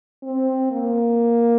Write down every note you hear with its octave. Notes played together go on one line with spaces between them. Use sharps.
C4
A#3